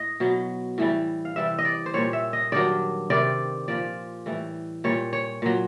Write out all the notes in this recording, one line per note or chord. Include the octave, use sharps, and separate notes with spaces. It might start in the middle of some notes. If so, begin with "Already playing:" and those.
Already playing: A2 D#5
B2 F#3
A2 E3 G3
F5
C3 E3 G3 E5
D#5
D5
C5
A#2 G3 C#5
E5
D#5
G2 D#3 F#3 D5
C3 D#3 G3 D5
A#2 F3 D5
A2 E3 G3
A#2 G3 C#5
C#5
A#2 F#3